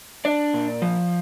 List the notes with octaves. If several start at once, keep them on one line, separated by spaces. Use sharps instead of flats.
D4 D5
A#2
F3